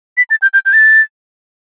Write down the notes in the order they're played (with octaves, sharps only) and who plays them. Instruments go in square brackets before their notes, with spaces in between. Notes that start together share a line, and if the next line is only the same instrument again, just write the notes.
[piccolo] B6
A6
G6
G6
G6
A6